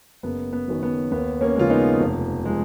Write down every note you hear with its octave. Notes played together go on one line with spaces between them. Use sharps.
F#1 B3
B3
F#2 D#3 F#3
B3
D#2 B3
A#3 C#4
C#3 F3 G#3 F4
B3 D#4
F1
F3 G#3